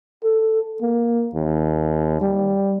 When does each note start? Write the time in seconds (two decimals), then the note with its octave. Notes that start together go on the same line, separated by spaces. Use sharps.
0.23 A4
0.82 A#3
1.34 D#2
2.21 G3